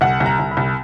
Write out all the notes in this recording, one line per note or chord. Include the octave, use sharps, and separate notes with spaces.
C2 F#5
C2
A#5
C2
B5
C2